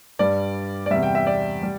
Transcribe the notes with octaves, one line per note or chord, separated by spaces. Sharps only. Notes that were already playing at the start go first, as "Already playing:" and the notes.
G2 G3 D5
D5
E2 C3 G3 E5
G5
E5
D5
G3